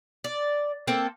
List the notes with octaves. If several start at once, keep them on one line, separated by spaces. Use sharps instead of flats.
D5
A#3 C4 A4